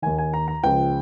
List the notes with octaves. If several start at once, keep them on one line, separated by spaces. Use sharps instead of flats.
D#2 D#3 G#5
G#5
A#5
A#5
C#2 C#3 F3 G5